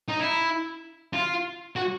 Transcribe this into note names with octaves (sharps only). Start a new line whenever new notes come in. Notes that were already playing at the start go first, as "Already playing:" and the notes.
D#4
E4
F4
F#4